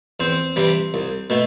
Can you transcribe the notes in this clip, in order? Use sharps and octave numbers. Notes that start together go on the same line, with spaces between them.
E2 C4 C5
C3 E3 G3
C2
B2 A3